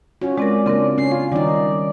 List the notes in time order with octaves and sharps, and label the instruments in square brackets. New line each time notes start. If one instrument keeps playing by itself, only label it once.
[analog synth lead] C#4 [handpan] F4 F#4
[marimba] G#3 C4 A#4 [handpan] C#4 [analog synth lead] D5
[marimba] C#3 C4 A#4 [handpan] A#3 D4
[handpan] C#4 [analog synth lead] C7
[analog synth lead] F4
[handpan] D#3 D#4 [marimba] G3 [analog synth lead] D5